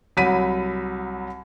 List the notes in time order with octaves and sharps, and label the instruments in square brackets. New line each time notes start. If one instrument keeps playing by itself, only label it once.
[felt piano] C2 F#3 B5 B6 D#7